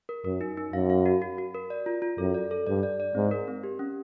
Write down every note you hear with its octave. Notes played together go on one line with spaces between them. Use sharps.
A#4
F#2 A#4
D#4
D#4
F#2 F5
F5
F#4
F#4
F#4
A#4
D5
F4
F4
F#2 A4
D5
A4
G2 D5
D5
D5
G#2 C4
A#4
C4
G4
C#4